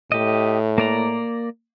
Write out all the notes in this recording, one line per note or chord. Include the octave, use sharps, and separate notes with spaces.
A2 G4 D#5
A#3 D5 A#5